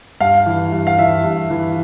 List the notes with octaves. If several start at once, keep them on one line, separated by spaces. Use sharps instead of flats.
G2 F5
E3
G2
F5
E3 E5
G2
E3